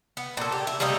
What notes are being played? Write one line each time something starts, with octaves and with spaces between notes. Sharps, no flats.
B3
A#2 A4
G4
E4
G3 A3 A#3 D#4